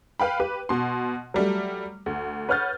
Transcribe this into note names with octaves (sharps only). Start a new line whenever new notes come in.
B4 F5 G5 B5
G4 B4
B2 C6
F#3 G3 A3
D2
B4 C#5 F#5 F6 G6 A6